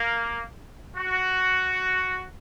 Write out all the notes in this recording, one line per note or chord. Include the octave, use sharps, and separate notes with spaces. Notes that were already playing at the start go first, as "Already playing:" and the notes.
Already playing: A#3
F#4